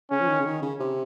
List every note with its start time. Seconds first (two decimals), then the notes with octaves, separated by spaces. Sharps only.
0.11 C#3 C#4
0.20 F3
0.28 D#3
0.40 C#3
0.45 D#3
0.62 C#3
0.80 C3